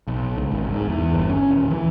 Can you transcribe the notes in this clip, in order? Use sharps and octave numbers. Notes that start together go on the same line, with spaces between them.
B1
C#2
G#1
G#2
E2
G1
C#4
D#1
E3